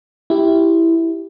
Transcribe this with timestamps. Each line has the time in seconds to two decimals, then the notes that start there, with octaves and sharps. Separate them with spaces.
0.30 E4 G4